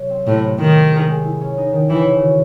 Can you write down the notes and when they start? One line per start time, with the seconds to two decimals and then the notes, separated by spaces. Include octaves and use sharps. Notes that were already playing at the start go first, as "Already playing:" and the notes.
Already playing: C3 F#3
0.10 C4
0.26 A2 C3
0.43 C3
0.59 C3 D#3
0.76 C4
0.92 G#4
1.07 G#3
1.25 E4
1.41 C#4
1.58 D#4
1.73 D#3
1.90 C#3 E3
2.06 C#3
2.22 F#4